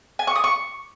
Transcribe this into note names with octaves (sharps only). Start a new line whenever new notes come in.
G#5
C#6
D#6
C#6